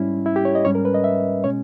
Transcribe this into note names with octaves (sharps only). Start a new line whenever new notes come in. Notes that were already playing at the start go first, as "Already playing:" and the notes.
Already playing: G#2 G3 C#4 E4
E4
G4
C#5
D#5
G#2 G3 C#4 C#5
A#4
B4
D#5
E5
B2 G#3 C#4 C#5